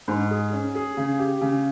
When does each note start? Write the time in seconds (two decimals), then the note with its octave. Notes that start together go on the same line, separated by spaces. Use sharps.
0.08 G#2
0.31 G#4
0.52 C#4
0.75 G#4
0.97 C#3
1.19 G4
1.41 C#3